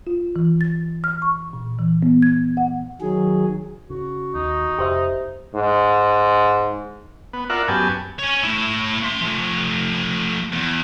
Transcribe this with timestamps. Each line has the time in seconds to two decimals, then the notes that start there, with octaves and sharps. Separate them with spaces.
0.07 F4
0.36 E3
0.61 A6
1.04 F6
1.22 C#6
1.53 A#2
1.79 E3
2.03 B3
2.22 G#6
2.57 F#5
3.01 D#3 F#3 G#4
3.90 C#3 F#4
4.34 D#2 D#4
4.78 F1 G4 C5 E5
5.55 G#2
7.33 B3
7.50 F4 A#4 D5 E5 F#5
7.68 F#2 B3 G4 G#5 A5
8.19 C#5 G#5
8.43 A3 E4
9.05 E5 C6
9.21 F3 A3
10.52 E2